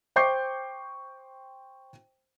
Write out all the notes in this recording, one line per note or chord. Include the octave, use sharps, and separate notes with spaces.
C5 G5 C#6 D6 G6 C7